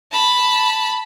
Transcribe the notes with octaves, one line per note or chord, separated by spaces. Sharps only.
A5 B5